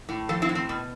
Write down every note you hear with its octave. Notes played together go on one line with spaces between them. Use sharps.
A2
F3 A4 C5
C4 E4
A2
C4
B2